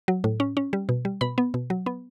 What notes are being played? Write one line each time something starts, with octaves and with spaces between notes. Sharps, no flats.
F#3
A2
C#4
C#4
G3
B2
G3
B2 B5
B3
B2
F#3
B3